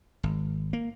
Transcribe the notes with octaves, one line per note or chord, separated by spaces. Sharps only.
G#1
A#3